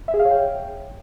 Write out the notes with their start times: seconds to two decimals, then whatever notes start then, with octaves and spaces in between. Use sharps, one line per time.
0.08 E5
0.14 G#4
0.19 F5
0.25 C#5
0.31 G5